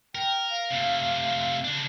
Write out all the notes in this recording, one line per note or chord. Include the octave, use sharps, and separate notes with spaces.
A#4 G5
F5
C3 A3
C#3 D4